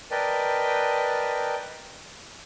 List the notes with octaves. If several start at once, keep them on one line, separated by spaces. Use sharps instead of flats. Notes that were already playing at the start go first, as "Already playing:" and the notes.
A#4 B4 D5 D#5 G5 A5